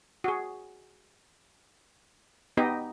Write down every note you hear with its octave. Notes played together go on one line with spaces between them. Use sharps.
F#4 G#4
B3 D#4 G4 D#5